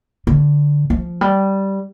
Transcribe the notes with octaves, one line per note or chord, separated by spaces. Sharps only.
D3
F3
G3